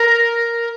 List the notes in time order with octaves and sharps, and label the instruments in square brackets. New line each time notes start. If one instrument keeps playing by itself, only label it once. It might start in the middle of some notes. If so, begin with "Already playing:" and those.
Already playing: [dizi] A#4